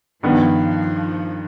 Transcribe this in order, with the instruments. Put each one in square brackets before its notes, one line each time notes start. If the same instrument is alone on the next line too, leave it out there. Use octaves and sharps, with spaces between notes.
[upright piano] G2 D#3 B3 [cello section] F3